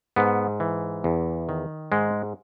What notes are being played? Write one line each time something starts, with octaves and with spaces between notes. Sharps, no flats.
G#2 B3
E3
E2
D#3
G#2 G#3